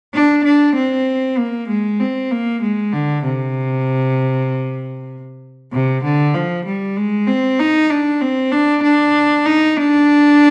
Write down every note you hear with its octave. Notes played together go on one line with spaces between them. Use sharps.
D4
D4
C4
A#3
G#3
C4
A#3
G#3
D3
C3
C3
D3
F3
G3
G#3
C4
D#4
D4
C4
D4
D4
D#4
D4